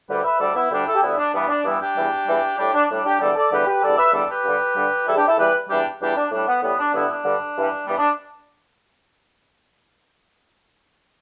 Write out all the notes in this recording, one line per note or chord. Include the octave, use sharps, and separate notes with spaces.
D2 D3 G3 G4 B4
B4 E5
D2 D3 G3 A4 D5
B3 E4
D2 D3 G3 D4 G4
E4 A4
G4
D2 D3 G3 B3 E4
D4
G2 E3 G3 B3
D4
G2 E3 G3 B3 E4
D4 G4
E2 E3 G3
E2 E3 G3
A2 G3 D4 G4
D4
A2 G3 D4
D4 G4
E2 D3 G3 A4 D5
A4 D5
E2 D3 G3 G4 B4
G4 B4
E2 D3 G3 A4 D5
B4 E5
E2 D3 G3 A4 D5
G4 B4
G2 D3 G3
G2 D3 G3
E2 E3 G3 E4 A4
D4 G4
E4 A4
E2 E3 G3 G4 B4
E2 E3 G3 D4 G4
E2 E3 G3 D4 G4
D4
A2 G3 D4
B3
A2 G3 B3
D4
G2 D3 G3 B3 E4
D4
G2 D3 G3
G2 E3 G3
G2 E3 G3 B3
D4